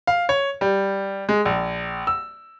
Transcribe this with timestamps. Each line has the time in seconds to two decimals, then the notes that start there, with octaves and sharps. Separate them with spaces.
0.07 F5
0.29 C#5
0.61 G3
1.29 G#3
1.45 A#1
2.07 E6